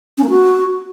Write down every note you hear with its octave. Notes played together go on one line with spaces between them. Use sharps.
C#4
A#3
F#4